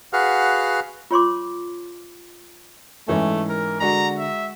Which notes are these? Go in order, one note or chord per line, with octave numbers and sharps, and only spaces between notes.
F#4 G#4 B4 F5 F#5 F6
F4 C#5 C6 D6
G#2 E3 A3 C#4
A#4
D3 G#3 F#4 A#5
E5